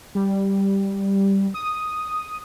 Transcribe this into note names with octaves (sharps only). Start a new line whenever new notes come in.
G3
D#6